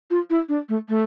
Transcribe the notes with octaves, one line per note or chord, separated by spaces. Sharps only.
F4
E4
D4
A3
A3